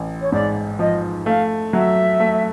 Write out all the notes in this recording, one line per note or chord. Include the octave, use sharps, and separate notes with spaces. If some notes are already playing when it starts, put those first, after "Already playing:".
Already playing: A1
C#5
G#2 D5
F3 D#5
A3 F5
F#3 E5
A3